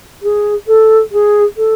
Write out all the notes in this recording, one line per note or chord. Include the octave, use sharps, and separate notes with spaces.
G#4
A4
G#4
A4